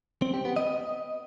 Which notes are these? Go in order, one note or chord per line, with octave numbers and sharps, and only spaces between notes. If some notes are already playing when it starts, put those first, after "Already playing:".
C4
G4
B3
D#5